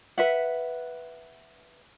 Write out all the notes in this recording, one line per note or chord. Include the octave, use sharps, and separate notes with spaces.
B4 E5 F#5